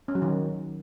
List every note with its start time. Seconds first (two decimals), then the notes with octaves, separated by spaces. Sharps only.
0.08 C#4
0.15 F#3
0.22 D#3